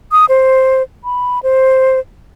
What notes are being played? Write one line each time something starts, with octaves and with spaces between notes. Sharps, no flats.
D#6
C5
B5
C5